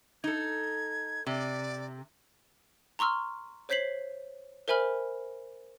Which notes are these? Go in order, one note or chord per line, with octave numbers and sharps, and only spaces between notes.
D#4 A4 G#6
C3 D5
A#5 C6 C#6 E6 F6
C5 C#5 G6 B6 C7 F#7
A#4 C5 E5 G#5 B5 F6